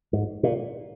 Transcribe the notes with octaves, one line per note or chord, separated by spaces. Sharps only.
G#2
A#2